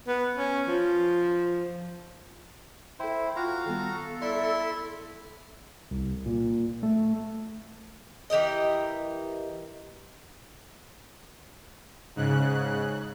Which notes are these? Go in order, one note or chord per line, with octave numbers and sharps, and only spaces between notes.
B3
C#4
F3
E4 A4 C5 G5
F4 F#4 F5 G5 A#5
D#3 G3 B3 A4
E4 D5 E5 C6
C2
A#2
A3
E3 G4 A#4 D#5
G#2 C#3 F#6